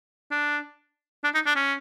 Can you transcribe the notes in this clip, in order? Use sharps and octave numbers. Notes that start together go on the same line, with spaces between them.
D4
D4
D#4
D4
C#4